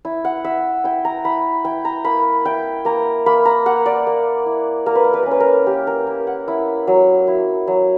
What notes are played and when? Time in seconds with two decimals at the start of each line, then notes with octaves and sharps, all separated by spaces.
0.05 E4
0.25 F#5
0.44 E4 E5
0.84 E4 G5
1.05 A#5
1.25 E4 B5
1.65 E4 G5
1.85 A#5
2.05 A#3 B5
2.45 E4 G5
2.85 A#3 A#5
3.26 A#3 B5
3.45 A#5
3.66 A#3 F#5
3.86 D5
4.07 A#3
4.46 E4
4.86 A#3 A#4
4.95 B4
5.04 A#4
5.14 B4
5.23 C#4 A#4
5.31 B4
5.40 A#4
5.66 A#3 G4
5.87 A#4
6.07 A#3
6.27 F#5
6.48 E4
6.87 F#3
7.27 E4
7.67 F#3